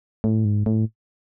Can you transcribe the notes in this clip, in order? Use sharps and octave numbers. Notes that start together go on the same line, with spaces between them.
A2
G#2
A2